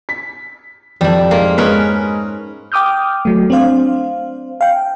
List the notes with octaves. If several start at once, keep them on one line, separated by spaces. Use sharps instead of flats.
B6
F2 G3 D4
G#2 A#3
G#3 C#4 A#4 B4
G5 D6 D#6 F6 G6
F#3 A3
C4 D4 C5 F5
F5 G5